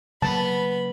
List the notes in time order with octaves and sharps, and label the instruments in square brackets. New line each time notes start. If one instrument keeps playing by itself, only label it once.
[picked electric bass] C#3 F#3 A#3 [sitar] B3 [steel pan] A5 [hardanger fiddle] B5